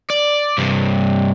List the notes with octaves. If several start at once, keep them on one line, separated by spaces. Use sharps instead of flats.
D5
G2 C3